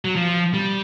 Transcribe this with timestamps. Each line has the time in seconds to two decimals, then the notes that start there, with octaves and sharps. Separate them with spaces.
0.05 F#3
0.16 F3
0.54 G3